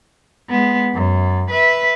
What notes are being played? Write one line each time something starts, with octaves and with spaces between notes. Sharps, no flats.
G#3 B3
F#2
B4 E5